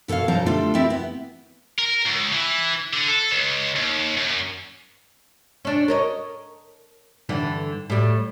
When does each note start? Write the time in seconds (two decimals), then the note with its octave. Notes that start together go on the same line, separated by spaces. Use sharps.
0.08 B2 A4 C5 C#5 F5
0.28 G2 B2 F#3 C5 A5 A#5
0.46 D2 G3 A3 D4 F4 A4
0.75 C4 E4 G4 D5 E5
0.90 B3
1.79 A#4
2.06 C#2
2.33 E3
2.94 D3
3.08 A4
3.31 C#2
3.76 D#2
4.17 F#2
5.65 C#4 D4
5.88 A#4 C#5 D#5
7.29 G2 D3 E3
7.90 A2 G3